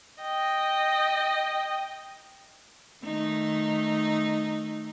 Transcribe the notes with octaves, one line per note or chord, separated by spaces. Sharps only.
D#5 G5
D#3 A3 D#4